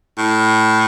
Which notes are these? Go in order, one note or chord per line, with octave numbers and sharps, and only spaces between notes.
A2